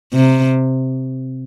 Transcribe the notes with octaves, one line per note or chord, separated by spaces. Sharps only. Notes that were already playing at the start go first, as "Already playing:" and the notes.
C3